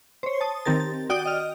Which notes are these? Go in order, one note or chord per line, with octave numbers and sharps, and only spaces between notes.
C5 C#5
A5 D#6
D#3 C4 G4 A#4 A6
A6
F#4 D5 G5 D#6 F#6 D7
D#5 F6